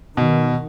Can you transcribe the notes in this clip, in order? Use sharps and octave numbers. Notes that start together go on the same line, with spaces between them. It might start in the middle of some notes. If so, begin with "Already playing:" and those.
B2 D#3